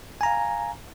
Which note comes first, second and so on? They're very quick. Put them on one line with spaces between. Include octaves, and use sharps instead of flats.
G#5 A#5 F5